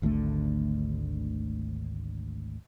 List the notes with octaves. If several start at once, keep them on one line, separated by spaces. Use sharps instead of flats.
G#1 D2 D3 A3